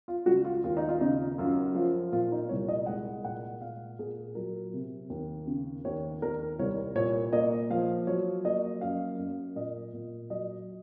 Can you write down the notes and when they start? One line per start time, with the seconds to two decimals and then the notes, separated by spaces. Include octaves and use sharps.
0.08 F4
0.26 C#2 F#4
0.45 F4
0.64 D#2 F4
0.77 D#4
0.89 F4
1.01 C#3 D#4
1.38 F#2 F4
1.75 F3 F4
2.12 A#2 F4
2.32 D#4
2.49 C2 C#5
2.68 D#5
2.86 G#3 F#5
3.24 A#2 F#5
3.61 A#2 F5
3.99 A#2 G#4
4.35 F#3 A#4
4.73 C3
5.10 D#2
5.47 C#3
5.85 D#2 C#5
6.22 D#2 A#4
6.59 C2 C#5
6.95 A#2 C#5
7.33 A#3 D#5
7.70 F3 F5
8.07 F#3 C#5
8.45 A#3 D#5
8.81 F#2 F5
9.19 F#2
9.56 A#2 D#5
9.93 A#2
10.30 F#3 D#5